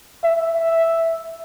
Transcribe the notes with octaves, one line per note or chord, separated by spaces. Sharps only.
E5